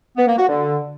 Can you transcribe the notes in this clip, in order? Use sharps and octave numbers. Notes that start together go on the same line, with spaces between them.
B3
A#3
F#4
D3